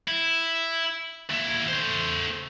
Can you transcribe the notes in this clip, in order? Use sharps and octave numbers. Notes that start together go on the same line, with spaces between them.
E4
D#2 E4
A3 C5